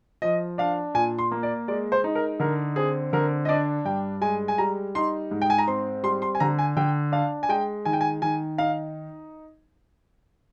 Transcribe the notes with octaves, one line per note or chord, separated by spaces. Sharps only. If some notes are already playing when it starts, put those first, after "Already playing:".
F3 D#5
D4 F5
A#2 G#5
C6
A#3
D5
G#3 D5
C5
D#4
A#4
D3 A#4
C4 G#4
D3 A#4
D#5
D4 D5
G2 G5
G#3 G#5
G#5
G3 A#5
D#4 C6
G#2
G5
G#5
A#5
C4 C6
G3 C6
C6
G#5
D3 A#5
G#5
D3 G5
D4 F5
G#5
G#3 G5
D#3 G#5
G5
G#5
D#3 G#5
D#4 F5